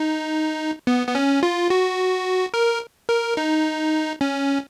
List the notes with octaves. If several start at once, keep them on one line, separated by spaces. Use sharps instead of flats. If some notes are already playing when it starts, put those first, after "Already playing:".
Already playing: D#4
B3
B3
C#4
F4
F#4
A#4
A#4
D#4
C#4